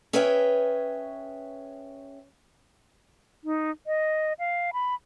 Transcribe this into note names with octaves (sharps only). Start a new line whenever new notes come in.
C#4 G#4 B4 C#5 E5 G5
D#4
D#5
F5
B5